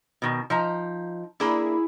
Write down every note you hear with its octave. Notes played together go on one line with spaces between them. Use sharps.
B2 D#3
F3 D#4 A#5
A#3 D4 E4 G#4 B5